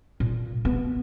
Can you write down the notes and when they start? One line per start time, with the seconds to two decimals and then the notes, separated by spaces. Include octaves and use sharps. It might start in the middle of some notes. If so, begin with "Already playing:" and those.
0.20 A#2
0.65 B3